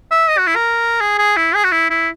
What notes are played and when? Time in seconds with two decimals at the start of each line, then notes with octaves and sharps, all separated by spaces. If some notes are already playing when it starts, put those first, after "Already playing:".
0.11 E5
0.29 D#5
0.38 F#4
0.47 E4
0.56 A#4
1.01 G#4
1.18 G#4
1.37 E4
1.55 G#4
1.64 F#4
1.72 E4
1.90 E4